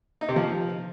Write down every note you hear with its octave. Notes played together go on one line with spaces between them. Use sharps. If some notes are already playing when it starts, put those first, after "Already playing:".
D#4
C3
F3